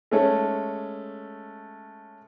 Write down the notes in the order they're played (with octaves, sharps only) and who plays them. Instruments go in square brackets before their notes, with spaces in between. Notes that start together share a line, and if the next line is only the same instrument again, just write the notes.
[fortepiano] G#3 A3 C#4